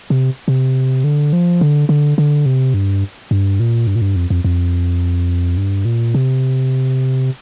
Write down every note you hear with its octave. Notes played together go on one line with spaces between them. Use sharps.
C3
C3
D3
F3
D3
D3
D3
C3
G2
G2
A#2
G2
A#2
G2
F2
F2
F2
G2
A#2
C3